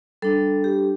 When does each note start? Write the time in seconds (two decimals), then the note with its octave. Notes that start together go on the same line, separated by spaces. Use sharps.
0.22 G3 D4 A4
0.64 G4